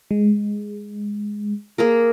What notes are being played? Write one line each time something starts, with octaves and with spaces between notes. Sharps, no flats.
G#3
A#3 G#4 A#4